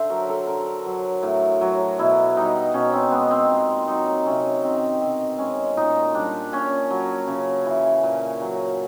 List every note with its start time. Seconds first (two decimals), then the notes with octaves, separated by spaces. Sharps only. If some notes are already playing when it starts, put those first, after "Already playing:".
Already playing: D3 C5 E5
0.10 F#3 A#4
0.29 A4
0.47 D3 A#4
0.86 F#3
1.23 A2
1.61 F#3
1.99 B2 E4
2.37 G3 D#4
2.74 B2 C#4
2.93 C4
3.12 G#3 B3
3.31 C4
3.50 A#2 C4
3.88 F#3 D#4
4.25 C3 C#4
4.64 D#3 C4
5.01 B2 C4
5.38 G#3 C#4
5.77 A#2 D#4
6.14 G3 D4
6.52 A#2 C#4
6.90 F#3
7.27 C#3
7.66 E3
8.03 A#2
8.42 F#3